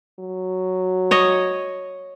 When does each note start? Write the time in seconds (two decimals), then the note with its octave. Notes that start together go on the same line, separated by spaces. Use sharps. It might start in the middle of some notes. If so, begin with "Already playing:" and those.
0.19 F#3
1.11 C#5 D#5